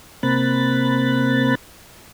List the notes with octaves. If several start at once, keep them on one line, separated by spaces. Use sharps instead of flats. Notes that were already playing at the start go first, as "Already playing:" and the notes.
C3 A#3 C4 B5 F#6 A6